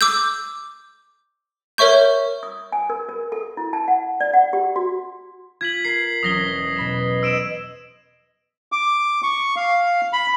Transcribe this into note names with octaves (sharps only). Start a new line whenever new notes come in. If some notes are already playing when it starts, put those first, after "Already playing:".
D6 E6 G6
A#4 C#5 E5 C#6 G6
D#6
G#5
A#4
A#4
A4
E4
A5
F#5
D5
F#5
G4
F#4
F4 G#6 B6 F#7
A#4 C7
E1 F#3 C#4 D#6 A#6 G7
B2 B5 E7
C5 D#5 E6 D7 E7
D6
C#6
F5
B5